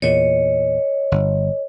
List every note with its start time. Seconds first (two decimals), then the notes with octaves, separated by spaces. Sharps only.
0.02 E2 A#2 C#5 D#5
1.12 G1